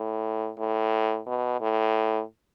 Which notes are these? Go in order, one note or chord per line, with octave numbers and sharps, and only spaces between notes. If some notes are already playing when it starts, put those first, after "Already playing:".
Already playing: A2
A2
B2
A2